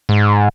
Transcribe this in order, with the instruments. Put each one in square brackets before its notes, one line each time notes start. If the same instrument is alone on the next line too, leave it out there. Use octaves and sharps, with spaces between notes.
[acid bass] G#2